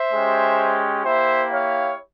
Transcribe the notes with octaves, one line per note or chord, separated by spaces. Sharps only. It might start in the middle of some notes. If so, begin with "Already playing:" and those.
Already playing: C5 E5
G#3 C#4 G4
A#3 E4 G4 C5 E5
C#5 F5